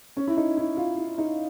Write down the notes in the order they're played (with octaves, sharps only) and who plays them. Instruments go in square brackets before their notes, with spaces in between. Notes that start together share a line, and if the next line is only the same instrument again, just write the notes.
[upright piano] C#4
E4
D#4
E4
F4
E4
D#4